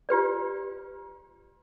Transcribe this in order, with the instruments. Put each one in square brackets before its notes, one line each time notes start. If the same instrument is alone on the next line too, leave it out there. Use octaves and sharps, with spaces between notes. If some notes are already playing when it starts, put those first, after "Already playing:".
[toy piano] F4 G4 B4 D5